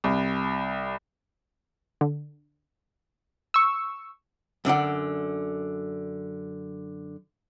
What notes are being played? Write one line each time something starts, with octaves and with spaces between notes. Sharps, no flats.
C2
D3
C#6 E6
F#2 D3 D5 F#5